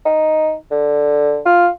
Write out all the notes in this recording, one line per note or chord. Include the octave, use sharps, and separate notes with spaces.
D#4
D3
F4